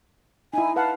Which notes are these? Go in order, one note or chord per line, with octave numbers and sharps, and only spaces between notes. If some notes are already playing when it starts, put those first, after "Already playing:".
D#4 E4 G#5
B4 F5 F#5 A5